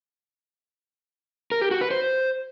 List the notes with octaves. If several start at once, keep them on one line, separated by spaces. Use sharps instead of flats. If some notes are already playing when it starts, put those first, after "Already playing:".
A#4
G4
F#4
B4
C5